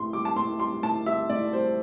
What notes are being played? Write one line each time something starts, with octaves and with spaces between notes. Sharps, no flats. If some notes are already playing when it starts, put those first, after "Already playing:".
Already playing: A2 G3 C6
G3 D6
A5
A2 C6
G3 C6
A2 A5
G3 E5
A2 D5
G3 C5